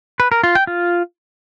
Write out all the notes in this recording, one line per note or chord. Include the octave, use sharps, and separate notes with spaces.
B4
A#4
F4
G5
F4